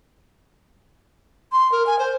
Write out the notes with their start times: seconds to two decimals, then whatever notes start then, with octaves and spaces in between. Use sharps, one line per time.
1.52 C6
1.72 A#4
1.87 G#5
1.99 C5